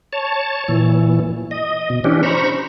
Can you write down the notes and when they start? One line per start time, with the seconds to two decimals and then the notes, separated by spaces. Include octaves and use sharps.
0.13 C#5 A5
0.68 A#2 E3
1.51 D#5
1.90 B2
2.04 E3 C#4 D4 G4
2.23 C5 A#5 B5 C#6